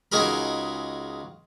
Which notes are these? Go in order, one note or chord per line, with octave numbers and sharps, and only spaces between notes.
C#2 D#4 F#4 G#4 A#4 B5